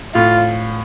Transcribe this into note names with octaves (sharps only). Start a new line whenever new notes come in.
A2 F4